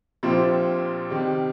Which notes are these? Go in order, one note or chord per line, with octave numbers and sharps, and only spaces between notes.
A#1 A#2 F3 C4 G4
C3 D#3 G3